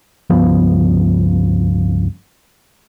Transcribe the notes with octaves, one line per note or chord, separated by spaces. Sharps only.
C#2 G2 F3 B3